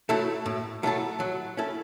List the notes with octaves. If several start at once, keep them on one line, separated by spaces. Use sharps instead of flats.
F#3 A3 E4 A4
A2
F#3 A3 E4 A4
F#3
C#4 E4 A4